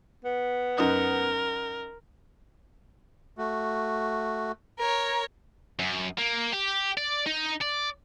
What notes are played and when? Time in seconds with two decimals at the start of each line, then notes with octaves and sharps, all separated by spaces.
0.24 B3
0.78 F#2 D#4 A#4 D#6
3.38 A3 F#4
4.80 A#4 C#5
5.79 F#2
6.19 A#3
6.54 G4
6.97 D5
7.26 D#4
7.61 D5